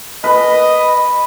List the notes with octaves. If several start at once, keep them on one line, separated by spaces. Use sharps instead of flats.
B4 D#5